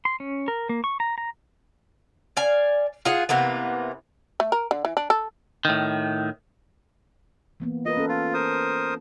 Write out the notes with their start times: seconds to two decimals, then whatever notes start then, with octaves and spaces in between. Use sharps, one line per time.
0.05 C6
0.20 C#4
0.48 A#4
0.69 A#3
0.84 C#6
1.00 A#5
1.18 A#5
2.37 D5 F5 G#5
3.05 F4 G#4 F#5
3.29 C3 E3 A#3 B3
4.40 A3
4.52 A#4
4.71 D3
4.85 E3
4.97 D4
5.10 A4
5.65 A2 D#3
7.60 E3 A#3 B3
7.86 F4 A#4 B4 D#5
7.97 C#4 A4
8.09 F4
8.34 A#4 C5 D#6